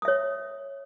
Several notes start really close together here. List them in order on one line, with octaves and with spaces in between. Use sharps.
D#6 E5 C#5